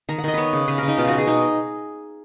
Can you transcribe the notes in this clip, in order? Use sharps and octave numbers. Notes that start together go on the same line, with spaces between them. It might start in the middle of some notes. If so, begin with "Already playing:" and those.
D#3 A#5
F#5
D#3 D#5
B3 B4 C#5
C#3
C#3 B4
C#3 A#4
D#4
B2 F4
B2 F#4
G#4
B2 D#4